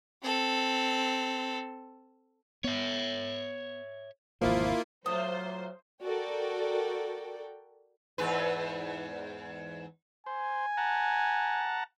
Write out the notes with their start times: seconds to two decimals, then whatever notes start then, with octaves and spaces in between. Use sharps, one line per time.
0.23 C4 A4
2.64 B3 C#5 E5
4.41 G#1 E2 B2 F3 A#3 E4 F4
5.06 A#2 F#3 A3 F4 C5 D#6
6.03 F#4 A4 A#4 D5 G5
8.18 E2 G#2 B4
10.26 C5 G#5
10.77 F#5 A5 A#5